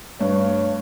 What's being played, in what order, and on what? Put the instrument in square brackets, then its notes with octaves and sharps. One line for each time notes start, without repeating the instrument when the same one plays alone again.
[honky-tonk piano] G2 [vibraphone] A3 D4 B4 [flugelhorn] C#5